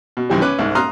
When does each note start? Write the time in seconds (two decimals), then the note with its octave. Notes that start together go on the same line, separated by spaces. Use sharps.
0.17 B2
0.29 F#2 C3 D#3 E3 G3
0.41 C#4 B4 D6 F#6
0.59 C2 G#2
0.75 A#5 C6 D#6 F6 F#6